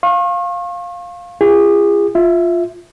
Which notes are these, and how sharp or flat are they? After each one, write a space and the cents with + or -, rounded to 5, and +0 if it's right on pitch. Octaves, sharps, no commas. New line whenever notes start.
F5 +5 C#6 -40
F4 -40 G#4 -30
F4 +0 E5 +0